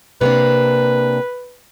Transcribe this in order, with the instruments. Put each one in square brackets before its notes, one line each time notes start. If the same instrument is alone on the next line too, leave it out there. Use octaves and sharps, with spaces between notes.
[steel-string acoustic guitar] C3 A#3 D4 [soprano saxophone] B4